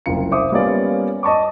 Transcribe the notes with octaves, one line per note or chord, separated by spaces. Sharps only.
F#1 C2 F4 C#7
C5 E5 D6 D#6
G3 A#3 B3 C#4 F4 D5
D#5 A5 C#6 D6